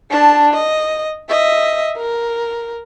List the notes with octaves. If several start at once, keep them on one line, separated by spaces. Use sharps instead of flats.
D4 A5
D#5
D#5 E5
A#4